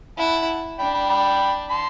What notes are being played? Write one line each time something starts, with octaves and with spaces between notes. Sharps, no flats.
E4 F#5 A5
D4 G5 B5
G5 B5
G5 B5
A5 C6